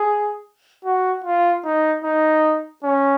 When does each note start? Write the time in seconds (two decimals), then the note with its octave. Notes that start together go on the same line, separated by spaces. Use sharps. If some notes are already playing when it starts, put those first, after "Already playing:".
Already playing: G#4
0.85 F#4
1.24 F4
1.65 D#4
2.04 D#4
2.84 C#4